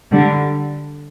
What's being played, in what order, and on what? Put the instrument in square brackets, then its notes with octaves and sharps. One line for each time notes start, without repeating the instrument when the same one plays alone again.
[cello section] D3 G3